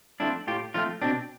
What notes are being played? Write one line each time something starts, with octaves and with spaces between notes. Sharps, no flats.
F3 A3 C4 D4 E4
A2 F4 G4
F3 A3 C4 D#4 F4
B2 C4 D4